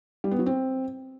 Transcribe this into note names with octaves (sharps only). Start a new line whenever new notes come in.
G3
B3
F#3
C4